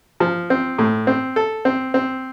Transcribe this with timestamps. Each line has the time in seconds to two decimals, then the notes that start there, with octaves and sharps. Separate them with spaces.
0.20 F3
0.50 C4
0.78 A2
1.07 C4
1.36 A4
1.65 C4
1.94 C4